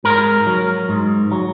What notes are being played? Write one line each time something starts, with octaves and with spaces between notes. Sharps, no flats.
G#2 A#4
F#3
G#2
F#3